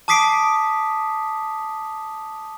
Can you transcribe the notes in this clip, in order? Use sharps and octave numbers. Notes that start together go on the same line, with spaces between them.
A5 D6 D#6 B6 C7 D7